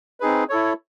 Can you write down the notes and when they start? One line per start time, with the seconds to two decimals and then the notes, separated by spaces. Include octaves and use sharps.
0.20 C4 D#4 G#4 B4
0.49 E4 A4 C#5